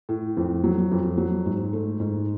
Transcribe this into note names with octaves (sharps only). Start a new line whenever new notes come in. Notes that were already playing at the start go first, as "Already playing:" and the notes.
A2
F2
F#3
F2
F#3
G#2
A3
G#2